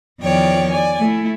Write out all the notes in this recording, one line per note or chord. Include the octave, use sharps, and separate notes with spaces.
E2 D#3 F3 C#5 D5 G5
D5 G#5
A3 E4